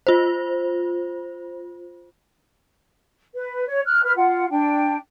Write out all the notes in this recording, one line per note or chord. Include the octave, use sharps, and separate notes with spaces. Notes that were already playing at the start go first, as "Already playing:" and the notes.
F4 C5
B4
C#5
F6 F#6
B4 F6
F4 F#5
D4 G5